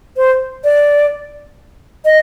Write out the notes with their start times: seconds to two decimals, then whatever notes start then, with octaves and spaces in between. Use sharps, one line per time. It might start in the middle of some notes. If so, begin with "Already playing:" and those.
0.17 C5
0.64 D5
2.05 D#5